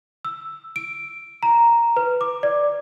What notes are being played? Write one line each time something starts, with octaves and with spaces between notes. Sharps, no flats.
E6
D7
A#5
B4
D6
D5